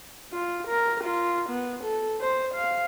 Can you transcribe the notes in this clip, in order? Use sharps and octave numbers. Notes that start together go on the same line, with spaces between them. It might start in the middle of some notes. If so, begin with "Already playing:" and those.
F4
A#4
F4
B3
A4
C5
F5